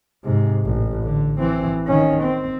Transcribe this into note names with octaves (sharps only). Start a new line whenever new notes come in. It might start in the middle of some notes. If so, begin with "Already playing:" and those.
G#2 C3
A1
D3
E3 C4
D#3 C#4
C4